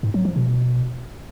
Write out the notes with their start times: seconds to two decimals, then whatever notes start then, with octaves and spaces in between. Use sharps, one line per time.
0.03 G#2
0.14 F#3
0.25 F3
0.36 B2